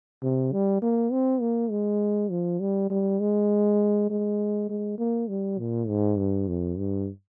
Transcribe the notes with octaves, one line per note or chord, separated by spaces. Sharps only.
C3
G3
A#3
C4
A#3
G#3
F3
G3
G3
G#3
G#3
G#3
A#3
G3
A#2
G#2
G2
F2
G2